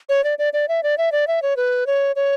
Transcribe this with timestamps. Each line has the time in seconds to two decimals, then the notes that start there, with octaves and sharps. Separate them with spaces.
0.09 C#5
0.24 D5
0.39 D5
0.53 D5
0.68 E5
0.83 D5
0.98 E5
1.12 D5
1.27 E5
1.42 C#5
1.57 B4
1.87 C#5
2.16 C#5